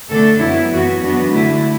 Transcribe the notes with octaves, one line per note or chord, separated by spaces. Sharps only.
D3 A3 D4 A4
F#2 F#3 B3 E4
F#2 E3 B3 F#4
F#2 E3 B3 D4 F#4
D3 A3 D4 E4